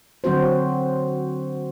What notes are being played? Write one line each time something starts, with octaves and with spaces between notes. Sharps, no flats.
D3 F#3 C4 F#4 C5